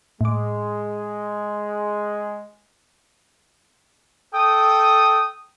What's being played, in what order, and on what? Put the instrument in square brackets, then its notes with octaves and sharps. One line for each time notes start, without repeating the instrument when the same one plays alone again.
[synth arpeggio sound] A2 D6 [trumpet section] G#3
[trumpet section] A4 G5 D#6